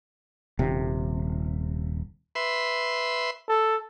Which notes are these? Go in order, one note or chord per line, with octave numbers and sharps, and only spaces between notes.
D#1 C3
B4 E5 C6
A4